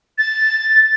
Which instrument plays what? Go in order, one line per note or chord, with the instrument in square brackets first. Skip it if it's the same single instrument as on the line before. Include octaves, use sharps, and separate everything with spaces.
[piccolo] A6